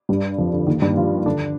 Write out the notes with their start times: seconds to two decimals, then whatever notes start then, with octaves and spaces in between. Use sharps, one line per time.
0.09 G2 G3
0.38 F2 F3
0.53 D3
0.67 D#2 D#3
0.82 G2 G3
0.97 F3 F4
1.26 D3 D4